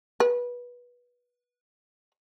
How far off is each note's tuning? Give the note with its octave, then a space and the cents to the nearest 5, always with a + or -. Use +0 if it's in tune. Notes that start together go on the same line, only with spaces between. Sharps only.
B4 -20